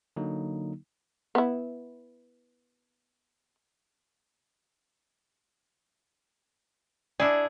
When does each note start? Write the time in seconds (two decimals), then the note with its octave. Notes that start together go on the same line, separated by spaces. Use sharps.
0.16 D3 F#3 A#3 D#4
1.35 B3 E4
7.20 D4 E4 G#4 D5